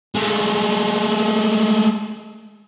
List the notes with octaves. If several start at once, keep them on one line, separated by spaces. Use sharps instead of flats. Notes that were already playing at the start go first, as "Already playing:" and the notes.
G#3 A3